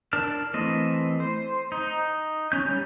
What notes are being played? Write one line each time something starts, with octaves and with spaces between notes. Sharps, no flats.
D4 A#4 D5 A5 F6
E3 A3 C4 D#5
C5
D#4
C#4 G6
G3 C#4